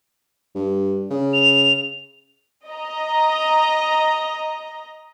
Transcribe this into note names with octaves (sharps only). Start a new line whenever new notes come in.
G2
C#3
F7
D#5 A#5